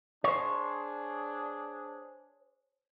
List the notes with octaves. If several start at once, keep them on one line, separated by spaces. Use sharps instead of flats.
D4 G#4 C5 C#5